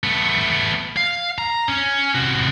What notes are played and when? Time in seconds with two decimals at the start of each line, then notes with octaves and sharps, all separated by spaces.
0.04 A3 B3
0.97 F5
1.38 A#5
1.68 C#4
2.15 C3 F#4